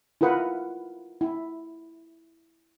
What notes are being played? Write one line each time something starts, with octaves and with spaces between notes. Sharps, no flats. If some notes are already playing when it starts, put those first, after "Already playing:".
E4 F4 A#4 B4 F#5
E4